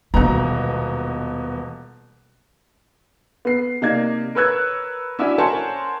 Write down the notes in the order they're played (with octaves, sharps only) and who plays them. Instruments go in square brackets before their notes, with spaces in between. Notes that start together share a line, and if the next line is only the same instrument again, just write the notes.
[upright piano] D#1 B2 A#5 [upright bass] E3 G#3
[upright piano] B3 C7
C3 A#3 D#4 D5 G#6
A#4 B4 C#5 E6 F#6 G#6
C#4 D4 E4 F#4 D5 E5
A#4 C5 C#5 F#5 G#5 A5